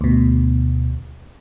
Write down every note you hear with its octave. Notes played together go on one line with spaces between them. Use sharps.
D2 B2